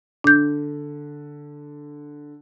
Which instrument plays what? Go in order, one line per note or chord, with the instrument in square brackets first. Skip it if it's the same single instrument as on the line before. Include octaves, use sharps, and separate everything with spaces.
[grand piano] D3 [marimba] D4 G6